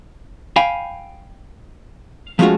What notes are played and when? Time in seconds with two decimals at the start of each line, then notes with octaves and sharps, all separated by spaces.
0.56 F5 G5 G#5 B5
2.39 F3 G#3 A3 C#4 F4 F#4